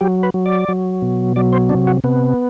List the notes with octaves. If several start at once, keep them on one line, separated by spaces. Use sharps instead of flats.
F#3 G4
B4
F#3
D5
F#3
B2
F#3 D5
C5
C3 D4
F#4
C3 B3